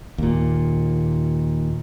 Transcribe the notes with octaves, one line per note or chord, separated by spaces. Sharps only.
D#2 A#2